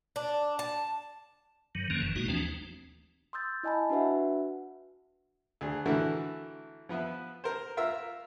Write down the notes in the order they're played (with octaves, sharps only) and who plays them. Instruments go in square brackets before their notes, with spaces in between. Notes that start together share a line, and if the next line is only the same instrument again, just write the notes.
[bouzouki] D4
A5
[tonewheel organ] G2 D#3 F#3
F2 D3 D#3 F3 A#3 C#4
G1 F#2 E3
B2 G#3 A#3 D#4 F#4
D#2 E3 F3 A3 C4 D4
[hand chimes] C6 D#6 E6 G6 A6
E4 D#5 G#5 A5 B5
D4 F#4 B4 E5 F#5
[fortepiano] D2 G#4
D3 E3 A3 E4 F#4 A#4
F3 B3 B4 E5
A#4 C5
F4 A#4 E5 E6